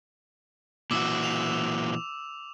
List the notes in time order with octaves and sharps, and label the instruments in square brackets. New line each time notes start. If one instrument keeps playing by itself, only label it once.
[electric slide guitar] A#2 E3 F#4 [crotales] D6 E6
[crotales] F7